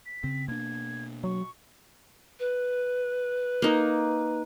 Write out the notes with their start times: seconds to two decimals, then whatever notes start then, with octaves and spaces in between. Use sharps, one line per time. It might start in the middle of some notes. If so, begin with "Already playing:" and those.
0.06 B6
0.24 C#3 C4
0.48 B2 A#3 D4 G#6
1.24 F#3 C#6
2.39 B4
3.62 A#3 D#4